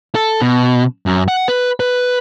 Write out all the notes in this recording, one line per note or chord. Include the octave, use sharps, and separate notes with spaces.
A4
B2
F#2
F#5
B4
B4